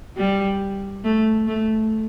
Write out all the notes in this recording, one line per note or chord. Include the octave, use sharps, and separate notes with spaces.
G3
A3
A3